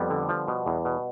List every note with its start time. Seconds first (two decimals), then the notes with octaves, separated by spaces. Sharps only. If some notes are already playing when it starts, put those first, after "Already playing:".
Already playing: F2 G3 B3
0.10 D3
0.29 F3
0.48 B2
0.66 E2
0.85 B2